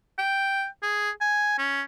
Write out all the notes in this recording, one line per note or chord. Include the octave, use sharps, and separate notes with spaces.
G5
G#4
G#5
C#4